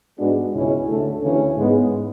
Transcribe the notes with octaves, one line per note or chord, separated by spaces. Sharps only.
G#2 G#3 B3 D4 F#4
C#2 B2 G#3 C#4 E4
D2 D3 A3
D2 C#3 E3 C#4 E4
G#2 G#3 B3